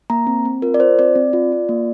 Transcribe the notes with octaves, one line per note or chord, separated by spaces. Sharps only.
A#3 A#5
C4
C4
F4 A#4
D5
F4 C5
C4 D5
C4
F4
F4
A#3